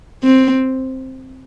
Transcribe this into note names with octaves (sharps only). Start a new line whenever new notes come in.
C4